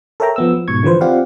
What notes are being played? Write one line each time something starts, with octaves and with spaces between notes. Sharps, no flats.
A4 A#4 C#5 E5 G5 A#5
F3 B3 E6
F3
G#2 B2 C#6 G#6
D3 E3 F3 B4 C5
C4 F4 G4 D5 F5 F#5